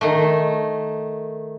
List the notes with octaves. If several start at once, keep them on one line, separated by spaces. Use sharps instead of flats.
D#3 A3